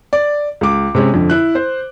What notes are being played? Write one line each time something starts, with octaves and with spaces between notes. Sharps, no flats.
D5
C#2 D6
C3 G#3 C#4
F2 D3
E4 F#6
C5